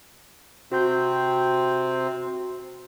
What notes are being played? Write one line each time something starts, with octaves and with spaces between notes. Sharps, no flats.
C3 C4 F#4 G6